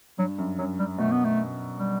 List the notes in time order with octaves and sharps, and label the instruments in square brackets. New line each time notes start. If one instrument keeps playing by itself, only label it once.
[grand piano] G2 [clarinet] F#3
[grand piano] F#2
[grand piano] F#2 [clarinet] F#3
[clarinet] G3
[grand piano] B2 [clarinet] A3
[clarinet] B3
A3
G3